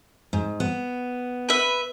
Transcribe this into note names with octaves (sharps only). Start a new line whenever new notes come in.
G#2
B3
B4 E5